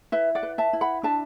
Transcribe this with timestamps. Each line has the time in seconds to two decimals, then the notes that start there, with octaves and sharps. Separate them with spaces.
0.12 E4 B4 E5
0.35 D5 F#5
0.43 B4
0.58 E5 A5
0.73 E4
0.81 F#5 B5
1.03 D4 E5 A5